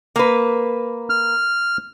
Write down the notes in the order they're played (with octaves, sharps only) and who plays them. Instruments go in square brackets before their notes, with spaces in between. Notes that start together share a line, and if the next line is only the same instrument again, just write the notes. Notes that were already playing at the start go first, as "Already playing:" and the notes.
[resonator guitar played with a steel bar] A#3 B4
[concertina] F6